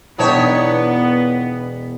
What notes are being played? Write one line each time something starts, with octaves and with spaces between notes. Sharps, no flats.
E1 B3 D4 D#4 C#5 A5 E7